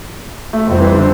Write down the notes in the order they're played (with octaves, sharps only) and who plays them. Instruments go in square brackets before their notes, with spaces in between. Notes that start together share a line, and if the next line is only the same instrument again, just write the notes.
[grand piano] A3
[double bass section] F2 C3 G3 C4
[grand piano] E3
D3